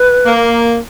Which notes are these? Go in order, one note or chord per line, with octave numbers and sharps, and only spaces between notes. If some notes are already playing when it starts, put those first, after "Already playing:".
Already playing: B4
A#3